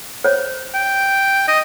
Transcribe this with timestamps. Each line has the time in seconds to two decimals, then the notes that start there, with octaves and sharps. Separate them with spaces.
0.24 C5 C#5
0.74 G5
1.48 D#5